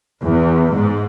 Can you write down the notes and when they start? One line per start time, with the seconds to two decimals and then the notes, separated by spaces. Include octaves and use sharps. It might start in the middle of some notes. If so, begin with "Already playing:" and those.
0.23 E2
0.73 G#2